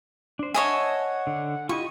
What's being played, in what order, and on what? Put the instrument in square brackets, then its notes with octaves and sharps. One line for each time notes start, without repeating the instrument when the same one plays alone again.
[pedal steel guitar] D4 C5
[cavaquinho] C#5 D#5 G#5 [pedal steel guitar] E5 A5 [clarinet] F#5
[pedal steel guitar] D3
[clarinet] E4 [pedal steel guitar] F4 G4 D#5 [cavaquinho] C#6